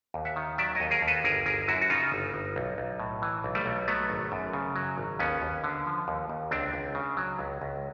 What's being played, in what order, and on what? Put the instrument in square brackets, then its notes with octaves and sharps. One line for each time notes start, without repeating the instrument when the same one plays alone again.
[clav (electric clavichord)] D#2
E5 F#5
D#3
F#3 D5 E5
D#2 C#5 D#5
G#4 A#4
D#2
A4 B4
G1 G#4 A#4
G1 G#4 A#4
F#2 E4 F#4
F#4
C#3 D#4 F4
G1
G1
B1
B1
A2
E3
B1
G3 A3
B1
F#3 A3 B3
G#1
F#2
C#3
F#3
G#1
D#2 B3 C#4
D#2
D3
F3
D#2
D#2
C#2 C4 D4
C#2
C#3
F#3
C#2
C#2